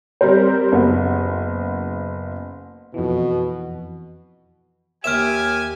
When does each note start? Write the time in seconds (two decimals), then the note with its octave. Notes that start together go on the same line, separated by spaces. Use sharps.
0.21 G3 C4 A#4 C5
0.72 F#1 B3
2.94 F2 B2 E3
5.04 D#2 G4 E5 G#5 F6 E7